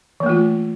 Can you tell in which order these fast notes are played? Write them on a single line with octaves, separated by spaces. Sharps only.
E3 A#3 A3 F4